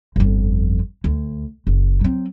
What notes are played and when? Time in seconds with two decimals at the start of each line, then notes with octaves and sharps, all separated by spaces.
0.16 G1 F2
1.04 D2
1.67 F#1
2.01 F#3 C4